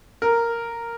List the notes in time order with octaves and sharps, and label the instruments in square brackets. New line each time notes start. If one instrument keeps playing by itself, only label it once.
[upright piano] A#4